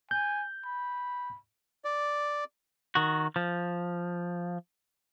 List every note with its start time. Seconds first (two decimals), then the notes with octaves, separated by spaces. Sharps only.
0.11 G#5 G6
0.65 B5
1.85 D5
2.95 D#3 F#4
3.36 F3